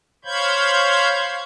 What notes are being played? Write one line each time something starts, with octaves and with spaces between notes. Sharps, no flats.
C5 C#5 F5 B5 G6 G#6